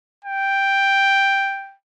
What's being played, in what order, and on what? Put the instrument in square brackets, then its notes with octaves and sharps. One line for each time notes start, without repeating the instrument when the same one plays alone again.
[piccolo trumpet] G5